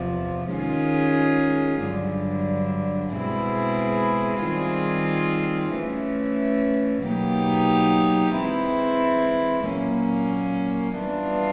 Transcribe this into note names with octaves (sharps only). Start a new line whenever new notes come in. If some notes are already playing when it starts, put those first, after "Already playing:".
Already playing: E2 C3 F3
D#3 G#3 C#4 F4 G#4
G2 D3 F#3
B2 G#3 C4 E4 G#4
D#3 G3 C4 F4 G#4
E3 A3 C#4
B2 F#3 A#3 D#4 G4
E3 G#3 C4 E4
A#2 F#3 A#3 C#4
E3 G3 B3 D4 F4